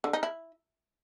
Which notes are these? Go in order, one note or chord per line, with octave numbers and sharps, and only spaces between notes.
D3
D#4
E4